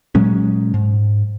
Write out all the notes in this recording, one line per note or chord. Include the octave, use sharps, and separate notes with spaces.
A#2 F#3 G#3 C#4
G#2